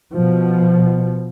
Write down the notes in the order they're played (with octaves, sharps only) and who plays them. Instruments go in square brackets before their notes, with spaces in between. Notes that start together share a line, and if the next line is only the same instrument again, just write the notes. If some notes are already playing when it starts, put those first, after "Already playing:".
[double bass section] B2 F3